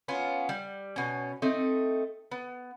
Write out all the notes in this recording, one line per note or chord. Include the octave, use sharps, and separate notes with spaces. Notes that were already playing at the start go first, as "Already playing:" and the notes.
B3 C#4 F4
G3
B2 C#4
A3 C4 D#4
B3